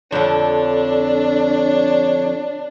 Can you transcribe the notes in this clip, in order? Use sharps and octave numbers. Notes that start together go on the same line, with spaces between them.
F2 D3 D4 C#5